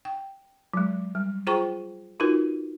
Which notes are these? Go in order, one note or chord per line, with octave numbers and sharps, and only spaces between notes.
G5
F#3 G#3
G3
F4 G#4 C5 G5 A#5 C#6
D#4 F4 F#4 A#4 B4